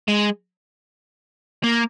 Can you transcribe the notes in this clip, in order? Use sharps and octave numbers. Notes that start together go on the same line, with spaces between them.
G#3
A#3